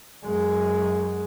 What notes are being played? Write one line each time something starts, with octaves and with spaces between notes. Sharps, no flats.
F#2 G#3